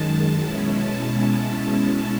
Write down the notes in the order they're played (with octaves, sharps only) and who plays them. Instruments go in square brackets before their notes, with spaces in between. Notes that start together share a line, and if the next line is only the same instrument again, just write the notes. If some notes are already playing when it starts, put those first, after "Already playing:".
Already playing: [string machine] F#2 D#3 G#3 A5
B2 G#3 C#4 E4
A5